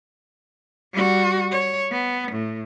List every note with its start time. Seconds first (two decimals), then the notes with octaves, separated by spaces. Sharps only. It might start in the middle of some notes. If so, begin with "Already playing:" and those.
0.93 G3 F#4
1.51 C#5
1.91 B3
2.32 A2